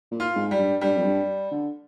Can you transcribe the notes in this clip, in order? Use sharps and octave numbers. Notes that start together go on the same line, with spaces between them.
A#2
F4
G#2
G3
G2
G2 G3
F2
G2
D3